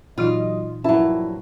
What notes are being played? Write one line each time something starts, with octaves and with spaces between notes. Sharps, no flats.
A#2 E3 F#3 D#4 F4 D#5
A#1 G2 F#3 E4 A5